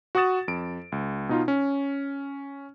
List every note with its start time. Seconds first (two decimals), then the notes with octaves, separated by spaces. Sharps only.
0.15 F#4 F#5 C#6 D#6 A6 E7
0.48 F2 D7
0.92 C#2
1.29 B2 D#4 F4
1.48 C#4